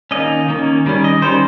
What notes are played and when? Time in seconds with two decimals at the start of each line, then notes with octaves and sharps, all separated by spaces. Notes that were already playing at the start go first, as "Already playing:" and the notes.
0.11 D#3 A#3 C#4 D#5
0.48 D#3 A#3 C#4
0.86 D#3 G3 C#4
1.04 D#5
1.22 D#3 G3 C#4 C5